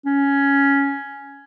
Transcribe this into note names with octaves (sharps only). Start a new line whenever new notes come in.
C#4